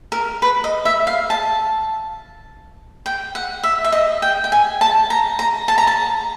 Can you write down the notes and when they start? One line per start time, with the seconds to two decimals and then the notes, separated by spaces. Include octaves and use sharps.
0.12 A#4
0.42 B4
0.64 D#5
0.85 E5
1.07 F5
1.30 A5
3.06 G5
3.35 F#5
3.63 E5
3.84 E5
3.92 D#5
4.22 G5
4.44 G5
4.52 G#5
4.81 A5
5.10 A#5
5.39 A#5
5.68 A5
5.78 A#5
5.87 A5